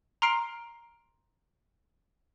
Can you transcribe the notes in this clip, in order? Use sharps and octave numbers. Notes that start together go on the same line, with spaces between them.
A#5 C6 F6 C7 D7